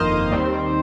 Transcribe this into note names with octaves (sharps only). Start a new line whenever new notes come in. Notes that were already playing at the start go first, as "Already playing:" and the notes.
Already playing: G1 F2 D#3 A#3 C5 D#5 F5
D#2 D#3 G3 C4